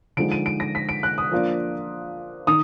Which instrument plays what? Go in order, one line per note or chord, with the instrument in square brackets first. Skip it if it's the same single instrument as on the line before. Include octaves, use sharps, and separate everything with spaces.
[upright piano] D3 F3 G#3 D#4 D7
D#7
D7
A#6
B6
D7
F#6
D#6
F3 A#3 D4 F4
D#3 D#6